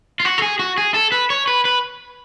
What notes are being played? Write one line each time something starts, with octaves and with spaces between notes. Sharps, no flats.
F4
F#4
A4
G#4
F#4
G#4
A4
B4
C#5
B4
B4